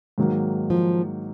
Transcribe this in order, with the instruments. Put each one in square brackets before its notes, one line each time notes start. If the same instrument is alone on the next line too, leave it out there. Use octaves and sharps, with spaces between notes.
[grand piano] G#2 D#3 F#3 A#3
[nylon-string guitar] F3